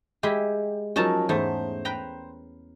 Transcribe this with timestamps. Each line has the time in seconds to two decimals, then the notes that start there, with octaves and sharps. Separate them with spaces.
0.23 G#3 E4 G4
0.96 F3 F#3 C#4 D#4 A#4 A5
1.29 E2 G#2 A3 C5
1.85 B4 G5 A#5